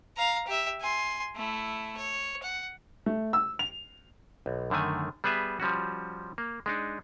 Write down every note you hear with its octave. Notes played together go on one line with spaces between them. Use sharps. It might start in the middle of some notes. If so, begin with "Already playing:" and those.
F5 A#5
G4 E5
G#5 C6
A3 E4
C#5
F#5
A3
E6
F7
B1
F#2 D3 D#3 A3 G#5
G3 B3 G#4 B4 E5
F3 G3 C#4 F#4
A#3
G#3 D4 D#4